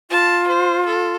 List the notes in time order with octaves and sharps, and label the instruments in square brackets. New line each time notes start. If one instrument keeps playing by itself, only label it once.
[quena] F4 [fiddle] A5
[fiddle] C5
A4